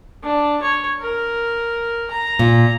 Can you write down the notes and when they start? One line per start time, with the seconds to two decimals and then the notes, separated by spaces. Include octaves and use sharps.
0.23 D4
0.62 C#5
1.00 A#4
2.10 A#5
2.39 A#2